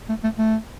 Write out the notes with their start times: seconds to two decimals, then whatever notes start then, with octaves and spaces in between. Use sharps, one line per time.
0.09 A3
0.23 A3
0.38 A3